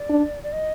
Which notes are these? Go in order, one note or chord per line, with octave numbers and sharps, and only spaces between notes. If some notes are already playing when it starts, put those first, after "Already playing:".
Already playing: D5
D4
D5
D#5